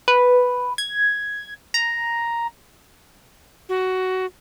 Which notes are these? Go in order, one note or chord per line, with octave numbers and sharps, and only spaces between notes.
B4
G#6
A#5
F#4